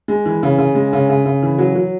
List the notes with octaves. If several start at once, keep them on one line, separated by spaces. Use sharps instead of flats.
G#3
E3
C#3
C#3
G#3
C#3
C#3
C#3
E3
F#3
F#3